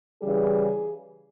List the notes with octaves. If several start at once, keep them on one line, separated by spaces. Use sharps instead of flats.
C#3 E3 G3 G#4